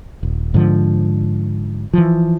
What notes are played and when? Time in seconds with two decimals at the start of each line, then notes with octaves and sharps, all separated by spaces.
0.23 D#1
0.54 G#2 D3 F3
1.94 E3 F3